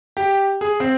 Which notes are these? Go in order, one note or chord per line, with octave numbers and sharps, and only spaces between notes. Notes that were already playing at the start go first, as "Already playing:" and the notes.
G4
G#4
C4